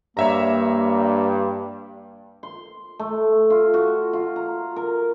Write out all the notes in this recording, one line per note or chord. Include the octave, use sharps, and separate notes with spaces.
G2 A#3 C#5 E5 A#5
C6
A3
F4
F#4
F4
A#5
A#4